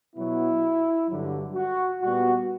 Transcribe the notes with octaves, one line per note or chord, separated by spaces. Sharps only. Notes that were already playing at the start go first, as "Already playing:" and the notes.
B2 F#3 B3 E4
G2 D3 F#3
F#4
A#2 G3 B3 F#4